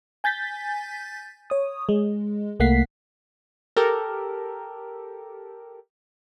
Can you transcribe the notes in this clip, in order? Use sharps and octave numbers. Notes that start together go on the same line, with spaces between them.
G#5 G6 A6 B6
C#5 D#6
G#3
C2 A3 A#3 F#5 B6 C7
G4 A4 A#4